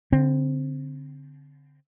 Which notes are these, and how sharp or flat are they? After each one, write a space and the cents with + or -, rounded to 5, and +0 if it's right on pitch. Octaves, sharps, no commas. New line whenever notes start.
D3 -30 C4 +0